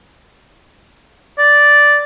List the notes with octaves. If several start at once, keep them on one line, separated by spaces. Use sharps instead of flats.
D5